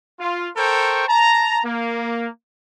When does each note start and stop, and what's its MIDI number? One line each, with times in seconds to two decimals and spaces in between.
0.20 0.49 65
0.57 1.06 69
0.57 1.06 70
0.57 1.06 72
0.57 1.06 79
0.57 1.06 85
1.08 1.60 81
1.08 1.60 82
1.64 2.28 58